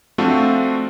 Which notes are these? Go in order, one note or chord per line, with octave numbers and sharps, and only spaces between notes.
F3 A3 C4 D4 F4 F#4